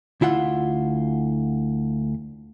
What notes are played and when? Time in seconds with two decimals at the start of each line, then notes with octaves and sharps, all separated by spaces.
0.21 D2 E4 F4 F#5